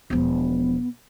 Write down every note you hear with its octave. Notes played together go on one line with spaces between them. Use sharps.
E1 F3 B3